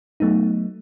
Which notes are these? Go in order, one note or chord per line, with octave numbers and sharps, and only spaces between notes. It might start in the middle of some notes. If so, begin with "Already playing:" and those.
F#3 A3 B3 D#4